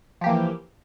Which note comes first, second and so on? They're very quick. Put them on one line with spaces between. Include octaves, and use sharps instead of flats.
F3 G4 A#3 E3